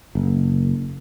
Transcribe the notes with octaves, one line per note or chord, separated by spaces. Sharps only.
F#1